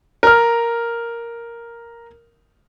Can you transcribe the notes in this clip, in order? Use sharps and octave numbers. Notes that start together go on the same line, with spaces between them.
A#4 F6